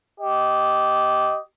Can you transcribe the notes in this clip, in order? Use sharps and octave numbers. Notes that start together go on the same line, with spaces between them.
G4 D#5